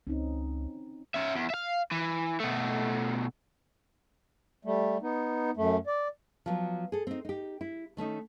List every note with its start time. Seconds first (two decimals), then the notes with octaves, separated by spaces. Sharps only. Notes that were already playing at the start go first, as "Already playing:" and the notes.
0.07 C#2 C4 C#4 D#4
1.15 C#4 E5
1.36 E2
1.50 E5 F5
1.91 E3
2.40 B2 A3
4.65 G3 A3
5.02 B3 D#4
5.57 F#2 A3
5.87 D5
6.46 F3 F#3 B3
6.92 G#4 A4
7.07 C4 D#4
7.25 D#4 G4
7.61 E4
7.97 D#3 A3 C#4 D#4